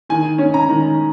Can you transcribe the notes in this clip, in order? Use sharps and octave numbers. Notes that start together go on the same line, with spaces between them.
D#3 G#5
C#4
A#5
D#3